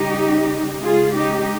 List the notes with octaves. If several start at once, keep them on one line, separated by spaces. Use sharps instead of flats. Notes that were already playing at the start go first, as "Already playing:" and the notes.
Already playing: C#3 G3 D#4 G4
C#3 G#3 F4 G#4
D#4 G4